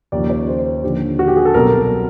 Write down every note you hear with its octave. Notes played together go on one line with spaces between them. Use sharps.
D#2 C#3 F3 D5
C#5
C5
D#2 D3 F3 G4
F#4
G4
G#4
A4
C2 B2 F#3 A#4